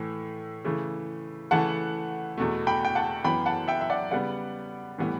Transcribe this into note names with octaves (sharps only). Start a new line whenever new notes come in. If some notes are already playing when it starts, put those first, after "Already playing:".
Already playing: A2 E3 A3
C#3 E3 A3
C#3 E3 A3 F#5 A5
E2 B2 A3
G5 B5
G5
F#5 A5
F#2 E3 B3 G5 B5
F#5 A5
E5 G5
E5
D5 F#5
C#3 G3 B3 D5 F#5
A2 E3 G3 B3